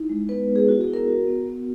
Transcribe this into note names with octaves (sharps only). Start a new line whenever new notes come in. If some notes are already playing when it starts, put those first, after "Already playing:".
Already playing: D#4 E4
G#3
B3 B4
B3
G#4
E4 F#4
G#4
E4
A#4
F#4
B3
B3